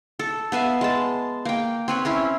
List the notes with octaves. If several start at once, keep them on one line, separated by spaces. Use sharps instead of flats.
A4
B3 B4 E5 F5
G#3 A5
A#3 G5
C4 B4 C#5
C4 C#4 E4